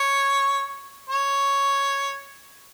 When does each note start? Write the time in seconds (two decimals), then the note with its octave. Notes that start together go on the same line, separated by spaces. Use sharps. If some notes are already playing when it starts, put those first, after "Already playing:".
Already playing: C#5
1.09 C#5